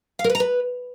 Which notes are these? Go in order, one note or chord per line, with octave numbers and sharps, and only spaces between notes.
F5
A#4
B4
A#5
B4